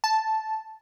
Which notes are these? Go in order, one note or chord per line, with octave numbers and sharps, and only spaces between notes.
A5